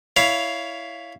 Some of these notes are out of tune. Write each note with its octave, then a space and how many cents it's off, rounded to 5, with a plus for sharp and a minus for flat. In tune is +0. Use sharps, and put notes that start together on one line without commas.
E4 +0 C#5 +15 F5 -5